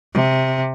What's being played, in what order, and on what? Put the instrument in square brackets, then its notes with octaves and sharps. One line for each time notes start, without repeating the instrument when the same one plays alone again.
[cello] C3